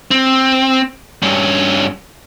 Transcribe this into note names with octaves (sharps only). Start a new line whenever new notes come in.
C4
G2 C#4